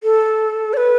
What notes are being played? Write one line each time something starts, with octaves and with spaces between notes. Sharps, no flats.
A4
D5
B4